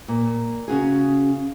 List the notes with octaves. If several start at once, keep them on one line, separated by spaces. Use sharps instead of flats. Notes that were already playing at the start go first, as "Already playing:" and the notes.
A#2
C#3 C#4 F#4 G#4